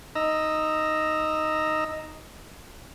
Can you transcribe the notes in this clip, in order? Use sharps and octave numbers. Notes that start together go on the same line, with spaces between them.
D#4 D#5 A#5 E6